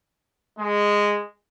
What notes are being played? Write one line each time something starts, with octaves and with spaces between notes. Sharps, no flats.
G#3